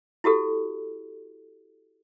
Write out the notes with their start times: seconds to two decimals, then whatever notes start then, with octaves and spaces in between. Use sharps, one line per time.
0.24 E4 F#4 G4 A4